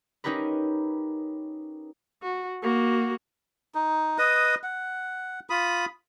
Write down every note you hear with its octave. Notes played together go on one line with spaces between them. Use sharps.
C#4 D#4 G4 A#4 B4
F#4
A#3 F#4
D#4
B4 D#5 D#6
F#5
F4 B5 D#6